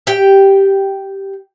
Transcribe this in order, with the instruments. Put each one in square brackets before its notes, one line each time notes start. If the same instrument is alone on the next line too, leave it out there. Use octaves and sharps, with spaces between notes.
[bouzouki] G4 G5